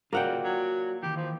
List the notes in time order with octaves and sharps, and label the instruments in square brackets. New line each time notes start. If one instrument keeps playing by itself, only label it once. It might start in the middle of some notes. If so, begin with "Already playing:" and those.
[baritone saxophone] C#3 [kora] A#3 F#5 G5 [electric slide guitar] F4 F#4 D5
[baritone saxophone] F#3
[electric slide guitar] D#3 E3 [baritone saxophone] G4
[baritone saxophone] F3